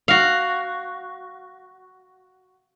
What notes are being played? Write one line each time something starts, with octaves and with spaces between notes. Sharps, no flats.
F#4 F5